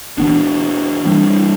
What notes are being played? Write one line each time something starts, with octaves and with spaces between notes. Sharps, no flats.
E3 B3 D4
E3 G3 D4